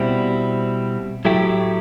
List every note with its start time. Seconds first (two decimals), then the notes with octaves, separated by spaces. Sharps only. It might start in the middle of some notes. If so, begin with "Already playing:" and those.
Already playing: B2 G3 C4 E4
1.25 A2 F#3 A3 E4 G4